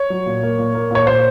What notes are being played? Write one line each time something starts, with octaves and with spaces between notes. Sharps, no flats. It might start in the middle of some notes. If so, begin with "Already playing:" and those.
Already playing: C#5
F#3
A#2
A#3
A#2
A#3
A#2 C#5
A#2 C5